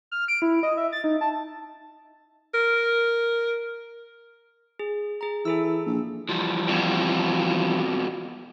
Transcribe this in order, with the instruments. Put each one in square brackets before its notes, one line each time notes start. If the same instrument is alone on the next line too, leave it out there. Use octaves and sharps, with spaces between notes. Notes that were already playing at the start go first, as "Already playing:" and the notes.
[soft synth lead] F6
D7
E4
D#5
E5
A6
D#4
A5
[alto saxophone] A#4
[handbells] G#4
G#4 A#5
[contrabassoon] E3 [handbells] G#4 A4 E6
[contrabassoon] A#1
[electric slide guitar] E3 F3 G3
[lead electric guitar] F2 B2